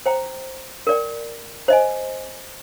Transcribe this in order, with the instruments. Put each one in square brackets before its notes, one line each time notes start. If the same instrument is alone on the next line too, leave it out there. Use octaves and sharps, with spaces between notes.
[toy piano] C5 G5 A#5
A#4 D5 G5
C5 D#5 G#5